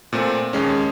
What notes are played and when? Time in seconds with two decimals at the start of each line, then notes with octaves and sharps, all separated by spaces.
0.13 A#2 A3 C4
0.53 D#2 G#3 C#4